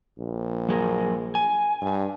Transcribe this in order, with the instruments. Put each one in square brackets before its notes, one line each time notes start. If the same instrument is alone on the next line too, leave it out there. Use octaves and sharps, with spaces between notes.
[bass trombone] A#1
[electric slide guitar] F#3 G#4 A#4
G#5
[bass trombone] G2